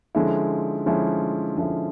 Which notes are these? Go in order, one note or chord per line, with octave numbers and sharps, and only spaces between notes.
D3 F3 G#3 C#4 E4
D3 F3 G#3 C#4 E4
D3 F3 G#3 C#4 E4